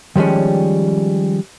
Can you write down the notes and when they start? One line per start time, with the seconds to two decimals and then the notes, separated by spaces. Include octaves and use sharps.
0.16 D#3 F3 G3 G#3 C#4